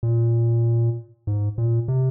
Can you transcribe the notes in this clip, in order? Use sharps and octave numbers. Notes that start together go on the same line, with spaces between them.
A#2
G#2
A#2
C3